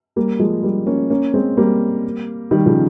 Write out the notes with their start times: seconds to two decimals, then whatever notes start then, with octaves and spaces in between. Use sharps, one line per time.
0.16 G3 A#3
0.39 F3 G#3
0.63 G3 A#3
0.86 A#3 C#4
1.10 A#3 C#4
1.34 G#3 C4
1.57 G3 A#3
2.51 D#3 G3
2.66 C#3 F3